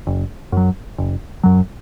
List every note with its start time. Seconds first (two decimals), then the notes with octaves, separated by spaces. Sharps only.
0.07 F#1
0.52 F#2 F#3
0.98 F#1
1.43 F#2 F#3